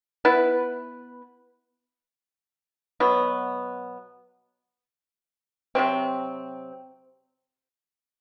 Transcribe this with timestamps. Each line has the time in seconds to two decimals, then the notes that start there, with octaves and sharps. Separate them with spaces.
0.25 B3 E4 B4
3.00 B2 F#3 B3
5.75 C3 F#3 C4